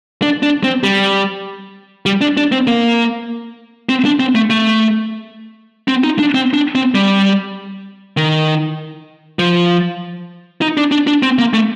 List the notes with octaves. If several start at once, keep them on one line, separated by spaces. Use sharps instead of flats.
D4
D4
C4
G3
G3
D4
D4
C4
A#3
C4
D4
C4
A3
A3
C4
D#4
D4
C4
D4
C4
G3
D#3
F3
D#4
D4
D4
D4
C4
A#3
A3